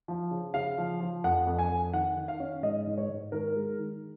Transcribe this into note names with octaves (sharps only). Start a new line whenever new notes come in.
F3
C#3
C#3 F5
F3
F3
F2 F#5
F2
G#5
F2
D#3 F#5
D#3
F5
C#4
G#2 D#5
G#2
C#5
G#2
D#3 A#4
G#3
D#3